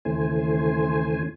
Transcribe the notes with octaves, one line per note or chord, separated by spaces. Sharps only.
D#2 C#3 E3 A3 C5 G#5